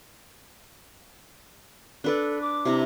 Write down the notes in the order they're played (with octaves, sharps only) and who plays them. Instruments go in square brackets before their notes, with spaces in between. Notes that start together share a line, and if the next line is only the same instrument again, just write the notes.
[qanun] D4 B4 D5 [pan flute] A4
[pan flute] D6
[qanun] C3 E4 A#5